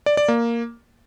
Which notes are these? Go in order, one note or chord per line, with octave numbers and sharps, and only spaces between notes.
D5
D5
A#3